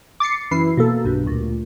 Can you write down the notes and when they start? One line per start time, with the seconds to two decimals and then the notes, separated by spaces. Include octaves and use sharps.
0.20 D6 A6 C7 C#7
0.51 F#2 E3 E4 C7
0.77 B2 A#3 A4
1.04 B1 G2 B2
1.27 D2 A#2